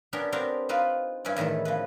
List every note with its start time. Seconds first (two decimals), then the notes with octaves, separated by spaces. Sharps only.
0.13 B3 C#4 D4 G4 A#4
0.32 B3 C4 D4 G4 A#4
0.69 C4 D#4 F4 B4 G5
1.25 G2 C#4 E4 B4 D5
1.36 E2 A2 D#3 E4 A4
1.65 C#3 F3 B4